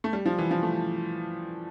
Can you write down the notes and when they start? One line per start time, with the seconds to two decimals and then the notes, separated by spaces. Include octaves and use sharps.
0.04 A3
0.13 G3
0.26 F3
0.39 E3
0.51 F3
0.63 A3